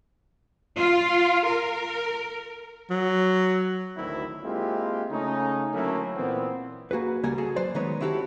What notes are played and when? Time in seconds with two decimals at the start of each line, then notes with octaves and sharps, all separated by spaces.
0.76 F4
1.45 A#4
2.90 F#3
3.97 G#1 D2 D#3 F#3 C4 E4
4.43 G#3 A#3 C4 E4 F4 G4
5.11 C#3 A3 C#4 D#4
5.73 D3 F#3 A3 A#3 C#4 E4
6.16 A#2 E3 B3 C4
6.91 A#3 F#4 G#4 B4
7.23 C#2 G3 A#3 F#5 G#5
7.38 F#4 G#4 A4
7.56 F#3 B4 C5 D5
7.74 D#3 G#3 B3 D#4 B4 C#5
8.01 C4 E4 F#4 G4 A4